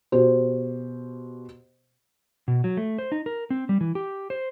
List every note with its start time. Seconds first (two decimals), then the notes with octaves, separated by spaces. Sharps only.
0.12 B2 G4 C5
2.48 B2
2.64 F#3
2.77 A3
2.98 C5
3.12 D#4
3.26 A#4
3.50 C4
3.69 G3
3.81 E3
3.95 G4
4.30 C5